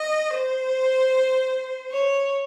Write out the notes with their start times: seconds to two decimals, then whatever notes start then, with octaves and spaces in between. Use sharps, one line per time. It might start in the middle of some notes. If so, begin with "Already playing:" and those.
Already playing: D#5
0.33 C5
1.91 C#5